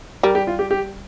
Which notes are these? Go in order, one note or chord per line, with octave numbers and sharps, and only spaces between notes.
G3 A#4
G4
F4
G4
G4